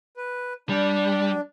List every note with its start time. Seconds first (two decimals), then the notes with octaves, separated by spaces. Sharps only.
0.17 B4
0.69 G3 D4